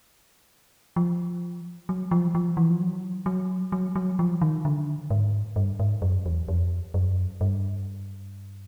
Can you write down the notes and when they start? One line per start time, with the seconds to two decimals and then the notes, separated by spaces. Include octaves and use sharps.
0.96 F3
1.89 F#3
2.11 F3
2.35 F3
2.57 E3
2.70 F3
2.81 F#3
3.26 F#3
3.72 F#3
3.96 F#3
4.19 F3
4.41 D#3
4.65 D3
5.10 G#2
5.56 G2
5.80 G#2
6.02 F#2
6.26 E2
6.48 F2
6.94 F#2
7.41 G2